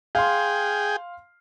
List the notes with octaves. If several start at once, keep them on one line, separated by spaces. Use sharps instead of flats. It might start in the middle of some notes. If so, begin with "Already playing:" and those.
G#4 F5 G5 C6